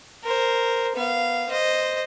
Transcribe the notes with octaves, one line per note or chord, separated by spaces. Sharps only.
A#4 C5
B3 F5
C5 D#5